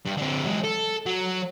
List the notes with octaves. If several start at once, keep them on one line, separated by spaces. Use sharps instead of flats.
G2
D3 C4
F#3 G#3
A4
F#3